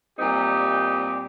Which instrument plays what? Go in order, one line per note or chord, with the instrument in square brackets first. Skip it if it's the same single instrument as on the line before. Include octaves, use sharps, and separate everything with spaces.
[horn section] A#2 G3 C4 D#4 G4